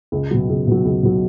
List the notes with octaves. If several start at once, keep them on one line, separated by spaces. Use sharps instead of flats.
C#2
B2 F#3
C#2
B2 F#3
C#2
B2 F#3